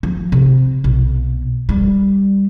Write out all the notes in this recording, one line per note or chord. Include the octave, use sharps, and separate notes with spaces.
F3
C3
B1
G3